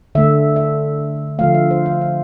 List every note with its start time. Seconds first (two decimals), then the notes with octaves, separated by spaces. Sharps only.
0.15 D3 A3 E5
0.56 E5
1.39 D3 F3 A3 F5
1.55 E5
1.71 C5
1.86 F5
2.01 F5